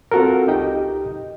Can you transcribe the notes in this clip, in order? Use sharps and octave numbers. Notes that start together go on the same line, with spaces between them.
C4 F4 F#4 A4 A#4
C#2 D#4 G4 D#5 G5